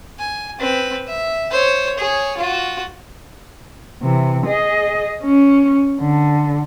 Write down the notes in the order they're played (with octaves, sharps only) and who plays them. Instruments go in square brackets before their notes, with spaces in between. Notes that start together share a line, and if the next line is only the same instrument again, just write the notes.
[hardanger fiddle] G#5
C4 B4
E5
C5 C#5
G#4 C#5
F4 F#4
[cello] C3 E3
G#4 D#5
C#4
D3